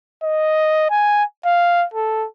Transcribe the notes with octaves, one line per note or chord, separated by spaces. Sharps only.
D#5
G#5
F5
A4